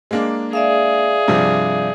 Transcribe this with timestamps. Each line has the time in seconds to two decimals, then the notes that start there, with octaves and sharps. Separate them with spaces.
0.11 G#3 A#3 D4
0.53 G#4 D5 E5 F5
1.28 G2 C3 F3